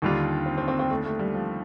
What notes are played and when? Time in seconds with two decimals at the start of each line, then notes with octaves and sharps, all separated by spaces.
0.02 D#2 D3 D#3 G3 D4 F4
0.46 C4
0.58 C4
0.68 C4
0.79 C4
0.90 A3
1.05 A3
1.19 G3
1.34 F3